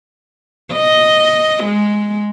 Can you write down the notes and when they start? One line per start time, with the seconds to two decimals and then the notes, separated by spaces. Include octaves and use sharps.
0.73 D#5
1.64 G#3